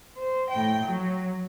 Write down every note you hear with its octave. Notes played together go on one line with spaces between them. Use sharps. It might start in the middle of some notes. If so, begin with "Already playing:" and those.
C5
A2 G5
F#3